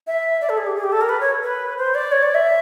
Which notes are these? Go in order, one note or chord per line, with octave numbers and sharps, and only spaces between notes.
E5
D5
A4
G#4
G4
G#4
G4
A4
A#4
B4
C#5
B4
C5
D5
C#5
D5
E5